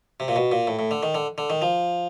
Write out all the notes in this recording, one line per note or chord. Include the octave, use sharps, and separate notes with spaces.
C3
A#2
B2
A#2
A2
A2
D3
D#3
D3
D3
D#3
F3